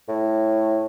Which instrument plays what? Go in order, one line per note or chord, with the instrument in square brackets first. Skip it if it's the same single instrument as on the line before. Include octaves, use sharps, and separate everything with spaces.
[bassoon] A2